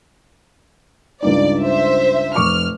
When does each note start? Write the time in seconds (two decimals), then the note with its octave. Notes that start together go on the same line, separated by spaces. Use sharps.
1.22 C#2 G2 D#4 D5
1.62 C5 E5
2.35 F1 C#6 D6 F6